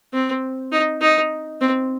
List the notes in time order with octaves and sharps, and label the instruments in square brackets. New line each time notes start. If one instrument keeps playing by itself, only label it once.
[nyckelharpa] C4
D#4
D#4
C4